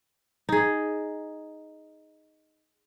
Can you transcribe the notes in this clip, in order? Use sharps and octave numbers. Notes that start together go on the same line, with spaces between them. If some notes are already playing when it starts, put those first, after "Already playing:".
D#4 G#4